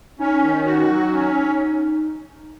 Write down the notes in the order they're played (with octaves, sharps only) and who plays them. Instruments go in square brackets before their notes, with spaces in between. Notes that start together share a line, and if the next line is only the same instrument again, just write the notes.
[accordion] C#4 [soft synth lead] D#4
[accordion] D#3
F#4
F#3
C#4